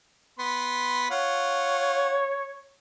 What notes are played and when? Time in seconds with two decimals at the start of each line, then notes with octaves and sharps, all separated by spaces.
0.39 B3 B5 C6
1.10 F4 C#5 F#5